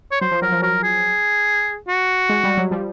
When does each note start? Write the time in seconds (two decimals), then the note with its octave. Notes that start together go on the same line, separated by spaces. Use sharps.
0.12 C#5
0.21 F#3 C5
0.31 F3
0.42 F#3 A#4
0.52 F3
0.62 F#3 A#4
0.84 G#4
1.88 F#4
2.29 G#3
2.44 G3
2.57 F#3
2.71 F3 G3